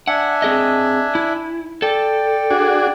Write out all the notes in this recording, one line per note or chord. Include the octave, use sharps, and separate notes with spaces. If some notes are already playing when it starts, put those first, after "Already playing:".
D4 E5 F#5 G#5
C4 G#4 D#5
E4
A4 D5 G5
D4 F#4 G#4